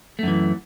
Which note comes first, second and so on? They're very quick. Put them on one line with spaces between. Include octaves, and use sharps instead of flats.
A3 F#2 E3